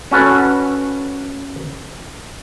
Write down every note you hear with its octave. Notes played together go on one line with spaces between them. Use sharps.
C#4 F#4 A4 B4